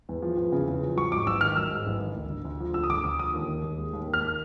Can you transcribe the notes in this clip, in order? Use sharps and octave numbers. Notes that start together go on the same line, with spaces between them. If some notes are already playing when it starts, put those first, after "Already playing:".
E2
F3
E2
C#3
E2
F3
F#3 C#6
G#2 D6
A1 E6
D#3 F6
F#3 E6
G#2
A1
D#3
D2
D3
D2
F3
D2 E6
D#6
D3 D6
D2 D#6
F3 D#6
D#2
D#3
D#2
G#3
D#2
D#3
F6